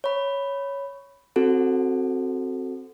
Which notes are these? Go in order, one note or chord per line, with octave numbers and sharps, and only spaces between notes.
C#5 B5
C4 F#4 A4